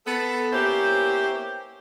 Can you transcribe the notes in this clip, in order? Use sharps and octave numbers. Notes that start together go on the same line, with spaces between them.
B3 A4
A#3 B3 C#4 E4 G4 C5